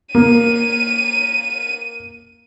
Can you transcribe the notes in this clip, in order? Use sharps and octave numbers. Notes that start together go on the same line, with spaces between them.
A#3 D#7